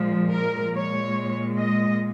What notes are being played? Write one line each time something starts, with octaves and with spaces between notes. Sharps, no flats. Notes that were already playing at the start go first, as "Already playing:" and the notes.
Already playing: A#2 F3 G#3
A#4
A#2 G#3 C#5
D#5